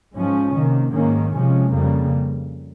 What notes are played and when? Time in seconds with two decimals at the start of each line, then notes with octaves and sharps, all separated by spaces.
0.16 G#2 F3 G#3 C#4
0.55 C3 D#3 A#3
0.94 G#2 D#3 A#3 C#4
1.33 C3 F3 G#3 C#4
1.73 F2 C#3 G3 A#3